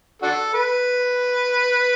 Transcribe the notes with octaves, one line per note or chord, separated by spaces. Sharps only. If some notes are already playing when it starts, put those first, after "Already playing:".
D4 F#4 A4
B4